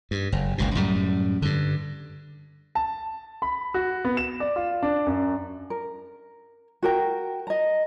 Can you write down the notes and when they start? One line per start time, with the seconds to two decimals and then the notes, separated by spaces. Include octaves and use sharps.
0.11 G2
0.32 F#1
0.58 F#1 C#2 B2
0.75 F#2 A2 G3
1.42 G2 D3
2.75 A5
3.42 B5
3.74 F#4
4.05 B3
4.17 E7
4.40 D5
4.56 F4
4.83 D4
5.07 F#2
5.70 A#4
6.82 F#4 A#4 G5
7.47 D#5 A#5